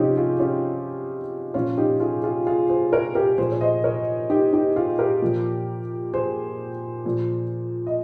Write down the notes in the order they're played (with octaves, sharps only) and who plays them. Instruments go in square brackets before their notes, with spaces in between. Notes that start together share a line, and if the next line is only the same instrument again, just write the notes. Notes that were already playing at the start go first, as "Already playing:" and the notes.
Already playing: [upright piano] C3 F3 C#4 D#4 F4 G4
F4 G#4
C#4 F4
A#2 F3 C#4 F4
D#4 G4
F4 G#4
F4 G#4
F4 G#4
G#4 C5
A#4 C#5
G4 A#4
A#2 F3 G#4 C5
C#5
C5 D#5
A#4 C#5
D#4 G4
D#4 G4
F4 G#4
G4 A#4
A#2 F3
G#4 C5
A#2 F3
D#5